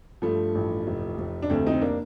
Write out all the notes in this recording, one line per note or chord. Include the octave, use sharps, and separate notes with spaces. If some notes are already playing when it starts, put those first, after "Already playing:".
G2 F3 A3
A1
F1
F1
D4
D2 A3 C4
C4 D#4
A#3 D4